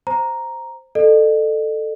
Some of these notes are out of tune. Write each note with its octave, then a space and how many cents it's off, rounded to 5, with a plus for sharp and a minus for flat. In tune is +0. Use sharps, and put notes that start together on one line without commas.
C5 +0 A#5 +0
A4 +0 D#5 -45